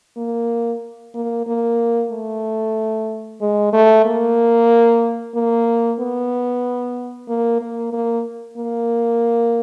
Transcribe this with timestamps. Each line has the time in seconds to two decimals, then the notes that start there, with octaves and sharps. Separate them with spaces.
0.17 A#3
1.15 A#3
1.47 A#3
2.11 A3
3.41 G#3
3.73 A3
4.05 A#3
5.35 A#3
6.00 B3
7.29 A#3
7.61 A#3
7.93 A#3
8.58 A#3